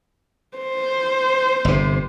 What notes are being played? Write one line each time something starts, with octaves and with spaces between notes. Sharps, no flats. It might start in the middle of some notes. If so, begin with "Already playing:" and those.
C5
G1 C3